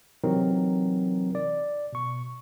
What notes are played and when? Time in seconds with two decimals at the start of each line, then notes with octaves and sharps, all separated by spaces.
0.24 C3 E3 F#3 C4 D#4 A#4
1.35 D5
1.93 B2 C#6